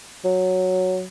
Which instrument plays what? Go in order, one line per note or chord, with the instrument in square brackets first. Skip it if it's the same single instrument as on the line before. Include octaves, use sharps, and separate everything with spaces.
[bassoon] F#3